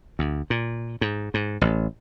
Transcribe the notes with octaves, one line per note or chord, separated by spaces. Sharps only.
D2
A#2
G#2
G#2
A1